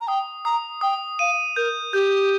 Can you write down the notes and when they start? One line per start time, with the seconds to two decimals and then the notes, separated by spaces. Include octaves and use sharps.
0.01 A#5
0.07 G5 D#6
0.45 A#5 D#6
0.81 G5 D#6
1.19 F5 D#7
1.56 A#4 G6
1.93 G4 G6